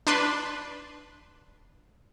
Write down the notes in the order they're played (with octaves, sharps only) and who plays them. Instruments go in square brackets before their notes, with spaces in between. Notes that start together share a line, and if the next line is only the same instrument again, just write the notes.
[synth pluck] D4 B4 C6